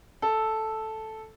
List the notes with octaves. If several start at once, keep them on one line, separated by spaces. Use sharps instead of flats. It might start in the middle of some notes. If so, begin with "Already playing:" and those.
A4